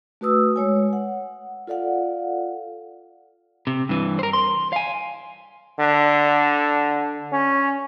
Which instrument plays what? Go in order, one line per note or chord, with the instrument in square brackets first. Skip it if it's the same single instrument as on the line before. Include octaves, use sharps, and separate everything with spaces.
[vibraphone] A3 F#4 B4 D#6 E6
G#3 C#5 G#5
F#5
F4 A4 D5 F5 F#5
[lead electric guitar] C3
G2 E3
A#4 C5
C6
F5 G#5
[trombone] D3
C#4